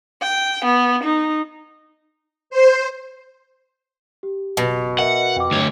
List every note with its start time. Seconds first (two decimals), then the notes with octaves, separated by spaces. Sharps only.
0.22 G5
0.64 B3
1.03 D#4
2.50 C5
4.23 G4
4.57 F#1 B2
4.99 A#4 D#5 E5 F#5
5.36 F2 G5 D6
5.51 D2 G2 C#5